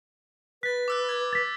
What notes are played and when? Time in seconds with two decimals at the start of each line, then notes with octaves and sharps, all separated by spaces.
0.63 B4 F#6 A6 B6
0.88 D6 E6 F#6
1.09 F#6 G#6
1.33 A6 B6